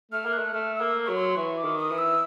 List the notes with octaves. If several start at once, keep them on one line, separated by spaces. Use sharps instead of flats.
A3 F6
A#3
F#6
A3
A3 F6
E6
A#3
F#3 C#6
C6
E3 C#6
D6
D#3
D#6
E3
E6